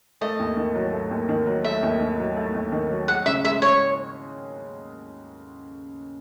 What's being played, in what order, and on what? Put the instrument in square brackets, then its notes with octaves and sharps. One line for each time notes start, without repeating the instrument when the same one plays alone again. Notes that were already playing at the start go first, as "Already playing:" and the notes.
[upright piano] A3 [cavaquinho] D#5
[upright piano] D#2
D#3
F#3
A3
D#2
D#3
F#3
[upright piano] A3 [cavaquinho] E5
[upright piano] D#2
D#3
F#3
A3
D#2
D#3
F#3
[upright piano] G#4 [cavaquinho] F#5
[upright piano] C#3 [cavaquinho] E5
[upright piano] G#3 [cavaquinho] E5
[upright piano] C#4 [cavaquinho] C#5